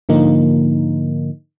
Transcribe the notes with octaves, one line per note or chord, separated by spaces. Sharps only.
G#2 D3 F3 A#3 D#4